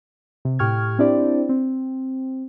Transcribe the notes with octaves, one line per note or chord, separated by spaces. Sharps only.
C3
A2 G4 G5 C#6 F6 G#6
C4 D4 E4 G4 C5 D5
C4